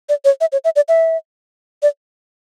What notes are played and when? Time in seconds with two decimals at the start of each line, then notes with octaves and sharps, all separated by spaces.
0.09 D5
0.24 C#5
0.40 E5
0.52 C#5
0.64 E5
0.76 D5
0.88 E5
1.82 D5